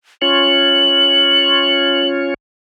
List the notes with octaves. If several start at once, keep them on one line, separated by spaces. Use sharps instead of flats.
C#4 F4 C#5 F#7